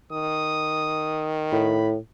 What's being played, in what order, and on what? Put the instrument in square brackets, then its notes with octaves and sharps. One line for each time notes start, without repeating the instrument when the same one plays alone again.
[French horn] D#3 [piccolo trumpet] D#6
[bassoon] A2 [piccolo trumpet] B5